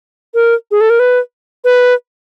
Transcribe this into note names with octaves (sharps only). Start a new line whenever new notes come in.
A#4
G#4
A4
A#4
B4
B4